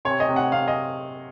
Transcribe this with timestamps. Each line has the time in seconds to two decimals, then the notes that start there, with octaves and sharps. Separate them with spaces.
0.05 C3 C#5
0.20 D#5
0.29 C3
0.36 F#5
0.52 C3 F5
0.68 D#5